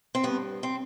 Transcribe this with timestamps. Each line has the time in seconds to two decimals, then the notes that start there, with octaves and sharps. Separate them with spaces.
0.15 C4
0.23 G2 B3
0.63 C4